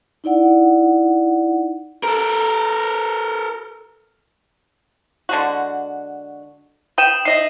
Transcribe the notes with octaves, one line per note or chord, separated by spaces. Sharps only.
D#4 E4 D5 F#5
A4 A#4
D3 G#3 F#4
B4 G5 D#6 D#7 E7
D#4 D#5 E5 C7